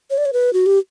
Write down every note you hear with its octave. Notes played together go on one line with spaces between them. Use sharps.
C#5
D5
C#5
B4
F#4
G4